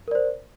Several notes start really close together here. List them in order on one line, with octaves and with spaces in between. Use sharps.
A#4 D5 C5